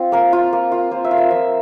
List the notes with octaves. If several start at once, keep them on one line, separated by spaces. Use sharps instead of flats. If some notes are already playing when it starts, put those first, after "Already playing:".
Already playing: C4 F4 G#4
A#3 A#4
F4
A#3
F4
A#3 C5
E5
F4
E5
F3 E5